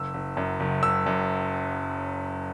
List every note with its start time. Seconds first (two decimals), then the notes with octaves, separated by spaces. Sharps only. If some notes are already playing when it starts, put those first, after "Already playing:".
Already playing: F#1 E6
0.14 F#1
0.37 F#2
0.60 F#1
0.83 F#1 E6
1.06 F#2